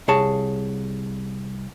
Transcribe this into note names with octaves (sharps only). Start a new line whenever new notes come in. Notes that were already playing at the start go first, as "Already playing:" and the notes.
C2 G#4 C#5 A5